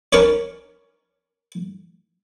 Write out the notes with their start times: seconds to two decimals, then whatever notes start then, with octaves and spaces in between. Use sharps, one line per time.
0.13 C#4 D4 A#4 B4 C#5 D5